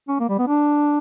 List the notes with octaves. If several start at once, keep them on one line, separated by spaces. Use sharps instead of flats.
C#4
A#3
G3
B3
D4